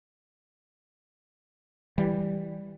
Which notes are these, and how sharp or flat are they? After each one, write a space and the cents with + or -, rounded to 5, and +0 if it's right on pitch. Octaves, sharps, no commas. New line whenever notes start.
E3 +5 G3 +0